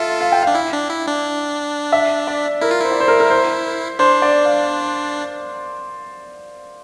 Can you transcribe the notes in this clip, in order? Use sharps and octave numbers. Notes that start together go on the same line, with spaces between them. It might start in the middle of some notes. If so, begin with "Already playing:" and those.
Already playing: F4 A4 E5
F5
G5
F5
D4
E4
D4
E4
D4
E5
D5
E4 A#4
F4
E4 C5
D5
C5
A#4
A#4
C5
D4 C5
D5
F5